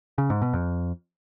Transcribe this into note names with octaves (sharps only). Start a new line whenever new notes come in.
C#3
G#2
B2
F2